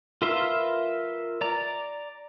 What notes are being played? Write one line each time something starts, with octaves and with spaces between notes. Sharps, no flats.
F4 A#4 B4 E5 C6
D5 A#5